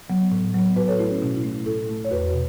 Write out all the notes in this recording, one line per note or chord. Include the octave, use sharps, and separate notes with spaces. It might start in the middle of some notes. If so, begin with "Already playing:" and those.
F#3 B3
A2
F#3 B3
A2 F#4 B4
A4 C#5
A3 E4
C#4 F#4
B2 C#4
E4
A3
A2 E4 A4
A3
C#5
E2 F#4 B4
B2